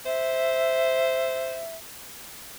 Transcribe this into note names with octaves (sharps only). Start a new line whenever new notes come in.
C5 E5